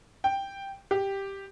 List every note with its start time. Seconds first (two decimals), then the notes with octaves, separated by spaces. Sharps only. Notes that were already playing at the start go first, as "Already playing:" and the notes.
0.24 G5
0.91 G4